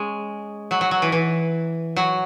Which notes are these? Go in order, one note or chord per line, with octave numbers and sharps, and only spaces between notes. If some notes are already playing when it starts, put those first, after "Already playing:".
Already playing: G#3 C#4
F#3
F#3
F#3
E3
E3
F#3